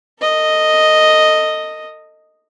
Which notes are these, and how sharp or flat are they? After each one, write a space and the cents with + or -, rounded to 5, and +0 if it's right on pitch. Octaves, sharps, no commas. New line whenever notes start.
A4 +40 D#5 +0